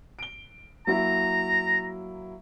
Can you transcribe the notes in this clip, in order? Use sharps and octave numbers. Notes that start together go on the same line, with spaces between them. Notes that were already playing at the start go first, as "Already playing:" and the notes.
D7 G7
F#3 A#3 E4 A#5